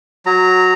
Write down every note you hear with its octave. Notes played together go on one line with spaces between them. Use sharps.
F#3 A#5